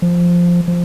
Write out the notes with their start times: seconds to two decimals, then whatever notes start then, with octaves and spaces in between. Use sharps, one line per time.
0.02 F3
0.68 F3